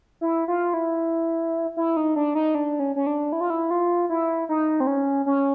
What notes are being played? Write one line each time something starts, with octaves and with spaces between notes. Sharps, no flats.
E4
F4
E4
E4
D#4
D4
D#4
D4
C#4
C#4
D4
E4
F4
E4
F4
E4
D#4
C4
C#4
C#4